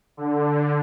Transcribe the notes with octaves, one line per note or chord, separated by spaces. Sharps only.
D3